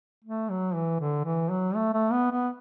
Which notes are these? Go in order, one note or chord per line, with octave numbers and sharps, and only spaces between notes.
A3
F#3
E3
D3
E3
F#3
A3
A3
B3
B3